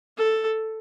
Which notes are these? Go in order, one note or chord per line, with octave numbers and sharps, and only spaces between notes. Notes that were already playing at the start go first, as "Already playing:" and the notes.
A4